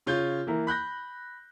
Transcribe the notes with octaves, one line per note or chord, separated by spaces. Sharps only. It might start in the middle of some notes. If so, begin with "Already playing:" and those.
C#3 F4 C#5 G6
E3 A#3 E4 A#4
B5 F#6 G6 A#6